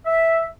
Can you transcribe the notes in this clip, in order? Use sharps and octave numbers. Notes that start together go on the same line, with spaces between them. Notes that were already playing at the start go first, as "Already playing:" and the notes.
E5